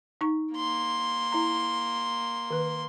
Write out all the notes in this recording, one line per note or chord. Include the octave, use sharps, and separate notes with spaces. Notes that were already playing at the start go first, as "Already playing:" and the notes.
D#4 C#6
A#3 C6
E4 A#5
D#3 B4